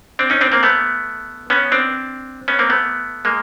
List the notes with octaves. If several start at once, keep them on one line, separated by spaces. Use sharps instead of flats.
C4 D4
C#4 D#4
C4 D4
A#3 C4
A3 B3
B3 C#4
C4 D4
B3 C#4
A#3 C4
A3 B3
G#3 A#3